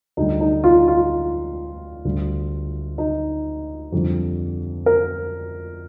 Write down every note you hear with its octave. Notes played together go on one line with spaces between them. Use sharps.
D2 D3 G3 D#4
D#4
F4
F4
D2 D3 G3
D#4
F2 D3 G3
A#4